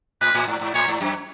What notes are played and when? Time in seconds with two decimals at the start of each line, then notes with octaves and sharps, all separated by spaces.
0.21 A2 B4
0.34 A2
0.48 G#2
0.61 G#2
0.74 A2 C#5
0.88 G#2
1.01 F#2